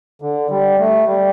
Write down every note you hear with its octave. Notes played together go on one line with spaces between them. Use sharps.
D3
G3
A3
G3